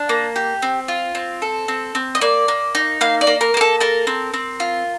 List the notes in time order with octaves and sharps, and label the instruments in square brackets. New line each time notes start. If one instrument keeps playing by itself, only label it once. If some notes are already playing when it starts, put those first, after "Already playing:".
Already playing: [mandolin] D4
A#3
G4
C4
F4
C4
A4
C4
C4
D#5
A#3 D5
A#3
D#4
A#3 F5
D5
A#3
A#4
A#3 A#4
A4
A4 A#4
C4
C4
F4